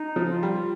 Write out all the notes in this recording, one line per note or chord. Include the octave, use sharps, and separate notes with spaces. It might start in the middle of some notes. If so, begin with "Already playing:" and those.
Already playing: D#4
F3
F4
G3